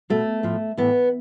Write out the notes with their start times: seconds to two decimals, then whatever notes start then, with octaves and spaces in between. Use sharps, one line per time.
0.10 B2 A3
0.43 A2 F3
0.77 A2 E3 B3